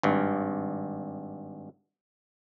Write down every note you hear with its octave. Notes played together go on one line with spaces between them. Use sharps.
G#1 G2